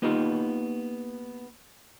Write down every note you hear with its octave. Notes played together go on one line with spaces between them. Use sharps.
A#3 B3 D#4 F4 G4